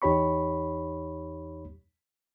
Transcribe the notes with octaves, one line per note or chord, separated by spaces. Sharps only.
E2 D#4 G4 C#5 B5 C#6